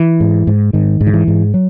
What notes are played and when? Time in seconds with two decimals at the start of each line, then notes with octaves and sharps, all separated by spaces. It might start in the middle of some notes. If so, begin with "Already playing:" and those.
Already playing: E3
0.20 G#2
0.47 G#2
0.73 G#2 D#3
1.01 G#2
1.07 D#3
1.14 E3
1.28 G#2
1.54 F#3